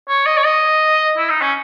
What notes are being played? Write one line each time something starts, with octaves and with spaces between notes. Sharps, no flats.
C#5
D#5
C#5
D#5
E4
D#4
C#4